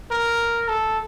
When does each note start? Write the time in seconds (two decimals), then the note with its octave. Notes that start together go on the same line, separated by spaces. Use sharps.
0.11 A#4
0.69 A4